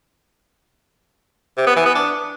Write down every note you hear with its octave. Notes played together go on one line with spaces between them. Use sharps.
C3
B3
E3
B3
D4